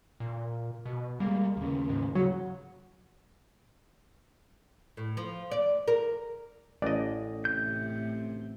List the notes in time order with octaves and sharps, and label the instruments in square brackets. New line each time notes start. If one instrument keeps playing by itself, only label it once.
[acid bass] A#2
B2
[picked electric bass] G3 G#3 [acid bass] A#3
[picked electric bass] D#2 C#3
[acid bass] G#2
[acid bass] C#3 [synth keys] F#3
[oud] A2
F3
D5
A#4
[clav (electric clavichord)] A1 D#5 [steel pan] D5
[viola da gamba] A2 C3 [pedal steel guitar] G6